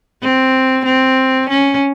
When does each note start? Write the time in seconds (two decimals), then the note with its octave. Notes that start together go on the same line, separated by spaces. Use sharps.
0.22 C4
0.85 C4
1.49 C#4